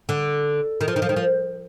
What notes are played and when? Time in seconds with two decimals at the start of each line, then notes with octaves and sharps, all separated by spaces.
0.09 D3
0.81 D#3
0.88 F3
0.96 D#3
1.02 F3
1.09 D#3
1.16 F3